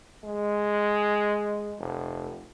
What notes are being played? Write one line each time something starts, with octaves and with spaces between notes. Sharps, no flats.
G#3
F1